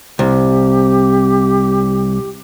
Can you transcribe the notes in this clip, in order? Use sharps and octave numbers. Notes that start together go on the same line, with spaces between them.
C2 G4